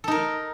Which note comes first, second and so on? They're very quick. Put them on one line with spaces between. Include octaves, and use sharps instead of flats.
A4 D#4 A#4